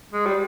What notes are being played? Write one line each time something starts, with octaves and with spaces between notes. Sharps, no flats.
G#3
G3